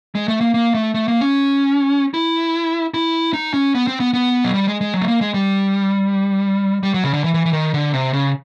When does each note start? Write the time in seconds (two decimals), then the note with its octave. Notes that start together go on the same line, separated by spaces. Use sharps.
0.15 G#3
0.28 A3
0.41 A#3
0.54 A#3
0.74 A3
0.94 A3
1.08 A#3
1.21 C#4
2.14 E4
2.94 E4
3.34 D#4
3.54 C#4
3.75 B3
3.87 C4
4.00 B3
4.13 B3
4.44 F#3
4.54 G3
4.67 G#3
4.81 G#3
4.94 F#3
5.02 A3
5.08 A#3
5.21 G#3
5.34 G3
6.83 G3
6.94 F#3
7.04 C#3
7.13 D3
7.24 E3
7.34 E3
7.46 E3
7.53 D#3
7.74 D3
7.94 C3
8.13 C#3